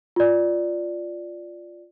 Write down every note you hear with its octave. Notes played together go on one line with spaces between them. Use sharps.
F4 D5